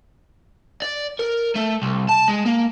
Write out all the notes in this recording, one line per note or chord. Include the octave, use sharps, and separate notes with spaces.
D5
A#4
A3
C2
A5
G#3
A#3